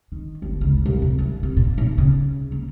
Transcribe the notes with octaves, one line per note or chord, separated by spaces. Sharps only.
D#3
G1
C#2
C2
F2
C2
C3
A#2
B1
C#3
A#3